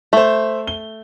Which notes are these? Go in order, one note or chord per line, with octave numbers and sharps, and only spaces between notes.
A3 C5 E5
G7